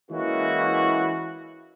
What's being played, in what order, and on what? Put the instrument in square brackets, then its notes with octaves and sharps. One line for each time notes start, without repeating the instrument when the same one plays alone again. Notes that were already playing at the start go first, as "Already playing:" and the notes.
[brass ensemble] E3 G#3 A#3 C#4 E4 F#4